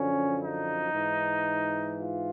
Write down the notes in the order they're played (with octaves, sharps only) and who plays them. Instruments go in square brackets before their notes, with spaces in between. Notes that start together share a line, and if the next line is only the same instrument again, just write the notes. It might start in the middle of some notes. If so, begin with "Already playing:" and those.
Already playing: [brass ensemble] F#2 D3 F3 C#4
D#4
G#2 E3
F4